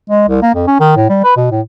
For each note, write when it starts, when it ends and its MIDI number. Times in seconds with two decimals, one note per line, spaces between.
0.10 0.24 56
0.28 0.42 36
0.42 0.51 58
0.55 0.65 41
0.67 0.76 61
0.80 0.93 51
0.96 1.08 45
1.09 1.20 55
1.24 1.34 71
1.36 1.46 47
1.51 1.60 45